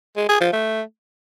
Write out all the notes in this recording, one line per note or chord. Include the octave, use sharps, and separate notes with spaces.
G#3
G#4
F3
A3